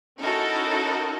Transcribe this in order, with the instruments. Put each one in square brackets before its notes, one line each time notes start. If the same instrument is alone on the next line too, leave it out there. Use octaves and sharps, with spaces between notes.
[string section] C#4 D#4 E4 F#4 A4 A#4